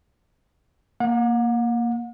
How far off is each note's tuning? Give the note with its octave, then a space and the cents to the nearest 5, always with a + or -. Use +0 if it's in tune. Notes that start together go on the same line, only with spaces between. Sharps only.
A#3 +0 F#5 -45